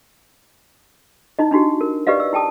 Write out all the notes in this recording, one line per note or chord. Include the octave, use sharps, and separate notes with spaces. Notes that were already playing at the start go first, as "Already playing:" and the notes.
D#4 E4 D#5
D4 D#4 F#4 G4
A#4
G4 B4 D5 D#5 F5
E6
E4 G5 A5 D#6